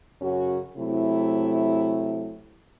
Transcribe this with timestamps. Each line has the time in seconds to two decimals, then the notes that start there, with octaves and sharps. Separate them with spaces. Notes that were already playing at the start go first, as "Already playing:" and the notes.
0.22 F#2 C#3 C#4 F#4
0.77 C3 F#3 A3 E4